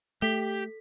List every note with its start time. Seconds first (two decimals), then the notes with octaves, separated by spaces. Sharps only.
0.22 A3 G4 A4 B6